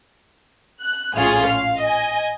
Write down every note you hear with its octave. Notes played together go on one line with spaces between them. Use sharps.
F#6
A#1 A2 C#4 F4 G#4
F5
D#5 G#5